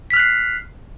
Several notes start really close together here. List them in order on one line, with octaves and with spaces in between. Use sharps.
B6 F6 F#6 C7